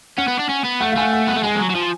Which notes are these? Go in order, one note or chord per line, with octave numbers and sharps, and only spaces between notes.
C#4 F#5
B3
D4
C#4
B3
A3 F#5
F5
A3 F#5 G#5
F#5
B3 F#5
A3
G#3 G#5
F3
F#3
F#3
F3